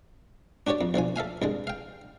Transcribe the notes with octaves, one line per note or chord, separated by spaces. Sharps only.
D4 F#4 G4 C#5 D5
F2
B1 D3 F3 G#5
A4 E5 F5 G#5
C2 D3 G#3
F5 G5